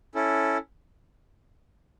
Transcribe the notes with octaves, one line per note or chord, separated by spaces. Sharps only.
C#4 E4 A4